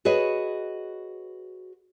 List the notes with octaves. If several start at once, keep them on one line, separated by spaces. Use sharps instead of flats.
F#4 G#4 B4 C#5 D#5